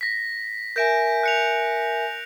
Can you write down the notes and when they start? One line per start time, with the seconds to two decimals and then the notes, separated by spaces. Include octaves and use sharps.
0.01 A#6 B6
0.76 A#4 E5 G#5 G6 A#6 D7
1.23 F#6 C#7 F7